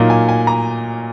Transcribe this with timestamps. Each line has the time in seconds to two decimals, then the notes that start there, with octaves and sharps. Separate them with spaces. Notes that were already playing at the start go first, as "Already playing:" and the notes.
Already playing: A#2 F#3 A#3 D#4
0.10 G#5
0.29 G#5
0.47 A#5